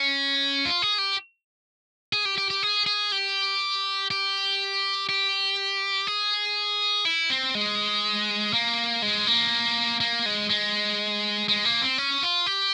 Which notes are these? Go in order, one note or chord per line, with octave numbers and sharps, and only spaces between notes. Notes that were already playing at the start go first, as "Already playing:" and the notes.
Already playing: C#4
F4
G#4
G4
G#4
G4
G4
G4
G#4
G#4
G4
G4
G4
G#4
E4
C4
G#3
A#3
G#3
A#3
A#3
G#3
G#3
G#3
A#3
C4
C#4
F4
G4